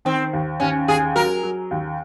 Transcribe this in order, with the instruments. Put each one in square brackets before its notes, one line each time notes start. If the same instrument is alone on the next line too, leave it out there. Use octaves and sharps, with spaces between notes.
[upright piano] D#3 [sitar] C4
[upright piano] D#2
[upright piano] D#2 [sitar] C#4
[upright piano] D#2 [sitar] G#4
[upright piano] F#3 [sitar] A#4
[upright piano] F#3
D#2